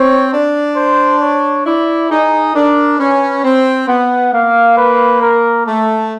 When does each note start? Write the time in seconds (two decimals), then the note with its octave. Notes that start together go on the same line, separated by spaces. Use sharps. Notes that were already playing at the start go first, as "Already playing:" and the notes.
Already playing: C4 C#5
0.32 D4
0.76 C5
1.22 C#5
1.66 E4 D5
2.11 D#4 G#4
2.55 D4 A#4
2.99 C#4 B4
3.44 C4 C5
3.88 B3 F#5
4.33 A#3 F5
4.78 B4
5.22 A#4
5.67 A3 A4